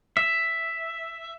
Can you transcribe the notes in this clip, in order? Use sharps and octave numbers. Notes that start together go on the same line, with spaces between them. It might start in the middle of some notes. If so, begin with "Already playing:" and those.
E5